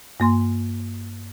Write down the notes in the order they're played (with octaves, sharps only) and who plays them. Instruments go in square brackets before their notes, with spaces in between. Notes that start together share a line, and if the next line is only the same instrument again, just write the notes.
[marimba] G2 A#3 C6